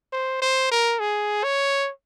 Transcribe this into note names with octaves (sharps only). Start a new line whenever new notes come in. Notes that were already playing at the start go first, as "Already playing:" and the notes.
C5
C5
A#4
G#4
C#5